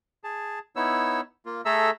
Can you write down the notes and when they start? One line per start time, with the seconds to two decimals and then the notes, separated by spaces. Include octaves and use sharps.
0.24 G#4 A5
0.76 B3 D#4 E4 C#5 E6
1.46 A#3 F4
1.65 A3 G#4 A4 E5 A#5 E6